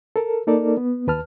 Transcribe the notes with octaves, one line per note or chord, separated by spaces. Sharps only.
A4 A#4
A#3 D#4 A4 A#4 D5
B3
D#2 B4 A5 F6